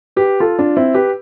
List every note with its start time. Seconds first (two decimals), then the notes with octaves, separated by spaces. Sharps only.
0.16 G4 B4
0.40 F4 A4
0.59 D4 F4
0.77 C4 E4
0.94 G4 B4